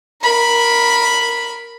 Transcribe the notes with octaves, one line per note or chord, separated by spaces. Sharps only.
A#4 B5